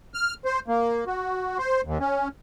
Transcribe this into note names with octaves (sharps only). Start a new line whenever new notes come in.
F6
C5
A#3
F#4
C5
D#2
C#4